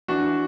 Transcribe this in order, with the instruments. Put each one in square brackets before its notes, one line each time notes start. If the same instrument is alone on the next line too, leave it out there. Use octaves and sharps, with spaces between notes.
[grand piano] E3 D4 F#4